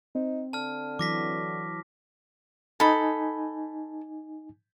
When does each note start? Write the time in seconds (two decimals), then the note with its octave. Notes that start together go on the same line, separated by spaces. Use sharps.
0.15 C4 D#4
0.53 D3 A5 F6
0.99 E3 F#3 F#4 D6 A#6 B6
2.80 D#4 A4 G#5 B5